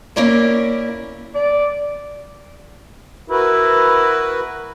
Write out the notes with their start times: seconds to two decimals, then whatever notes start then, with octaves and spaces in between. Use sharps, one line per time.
0.16 A#3 C#4 E4 A#4 D5
1.35 D5
3.30 E4 F#4 A#4 B4